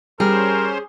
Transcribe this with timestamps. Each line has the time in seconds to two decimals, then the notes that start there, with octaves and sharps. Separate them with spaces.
0.20 G3 C#4 G#4 A#4 C5